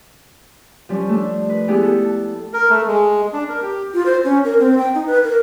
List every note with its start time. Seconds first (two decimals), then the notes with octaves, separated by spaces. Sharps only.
0.89 F3 G3 C#4
1.09 A3 D4
1.49 B4
1.67 G#3 B3 E4 G4 G#4
1.82 A4
2.04 A5
2.54 A#4
2.70 A3
2.88 G#3
3.33 D4
3.49 A#4
3.62 G4
3.94 F4
4.06 C5
4.24 C#4
4.44 A#4
4.59 C4
4.78 G5
4.95 D#4
5.07 B4
5.23 A#4